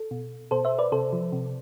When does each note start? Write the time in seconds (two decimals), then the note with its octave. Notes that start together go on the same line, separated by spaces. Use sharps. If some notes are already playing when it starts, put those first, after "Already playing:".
Already playing: A4
0.11 B2
0.51 B2 A4 C5
0.65 C5 E5
0.78 B4 D5
0.92 C3 A4 C5
1.13 F3
1.32 C3